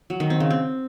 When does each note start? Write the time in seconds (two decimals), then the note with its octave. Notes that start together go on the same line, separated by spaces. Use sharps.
0.10 F#3
0.20 D#3
0.30 C4
0.40 C#3
0.50 C4